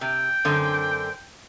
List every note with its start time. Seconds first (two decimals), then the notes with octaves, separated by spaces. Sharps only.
0.01 C3 G5
0.45 F#2 D3 C4